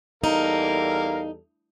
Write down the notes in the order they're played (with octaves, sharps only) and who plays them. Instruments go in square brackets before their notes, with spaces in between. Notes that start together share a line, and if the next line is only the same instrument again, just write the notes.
[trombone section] E2 G3 A4 [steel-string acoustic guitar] D#4 [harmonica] A#4 F5